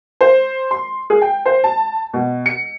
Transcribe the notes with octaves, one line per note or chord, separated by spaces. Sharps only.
C5
C6
G#4
G5
C5
A5
B2
C#7